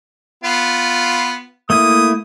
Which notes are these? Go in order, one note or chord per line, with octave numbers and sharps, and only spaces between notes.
B3 F4
A3 A#3 E4 D#6